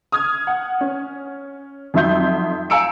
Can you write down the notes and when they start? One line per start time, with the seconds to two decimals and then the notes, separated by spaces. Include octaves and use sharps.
0.12 D#6 F6 G#6
0.47 F#5
0.81 C#4
1.94 F2 F#3 D#4 E5 C6 G6
2.70 F5 G#5 A#5 E6 C#7 D7